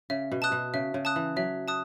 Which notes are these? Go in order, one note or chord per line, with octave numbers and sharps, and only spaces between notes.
C#3 E5
B2
A5 D#6 F#6
B2
C#3 E5
C#3
A5 D#6 F#6
E3
F#3 E5
A5 D#6 F#6